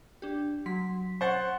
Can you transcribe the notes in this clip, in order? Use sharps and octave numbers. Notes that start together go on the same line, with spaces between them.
D4 G4
F#3 C6 B6
C5 F#5 C#6 A6